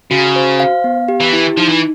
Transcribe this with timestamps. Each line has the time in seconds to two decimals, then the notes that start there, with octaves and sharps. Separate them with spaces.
0.11 C#3 F#4
0.36 C5
0.60 F5
0.84 B3
1.08 G4
1.20 E3
1.33 E4
1.57 F3 D#4
1.69 E3